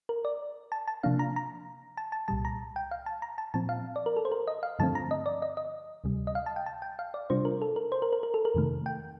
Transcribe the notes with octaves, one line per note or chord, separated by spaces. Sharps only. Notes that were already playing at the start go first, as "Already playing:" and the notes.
A#4
D5
A5
A5
C3 F3 A#3 D4 F5
A#5
A#5
A5
A5
C2 A#2 G3 A5
A#5
G5
F5
A5
A#5
A5
A#2 F3 C4 A5
F5
D5
A#4
A4
C5
A#4
D#5
F5
G2 D3 F3 A3 C4 A5
A#5
D#5
D5
D#5
D#5
D2 C3 G3
D#5
F5
A5
G5
A5
G5
F5
D5
C3 G3 D4 F4 C5
A#4
A4
A#4
C5
A#4
A#4
A#4
A4
A#4
F2 C3 D#3 A3
G5